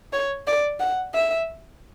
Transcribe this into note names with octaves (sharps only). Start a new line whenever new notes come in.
C#5
D5
F#5
E5